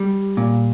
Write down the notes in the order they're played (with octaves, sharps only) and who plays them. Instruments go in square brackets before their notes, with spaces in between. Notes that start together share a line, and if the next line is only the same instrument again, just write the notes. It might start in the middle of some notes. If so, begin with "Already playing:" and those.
Already playing: [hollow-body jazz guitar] G3
A#2